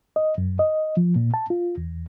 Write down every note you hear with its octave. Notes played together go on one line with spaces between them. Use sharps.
D#5
F#2
D#5
F3
A#2
A5
F4
E2